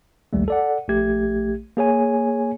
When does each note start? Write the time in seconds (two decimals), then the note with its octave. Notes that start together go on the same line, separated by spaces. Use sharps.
0.33 A#1 D#2 G3 A3
0.48 A4 D5 F#5
0.89 A#1 A3 G4 G#6
1.77 A#3 G#4 C#5 G#5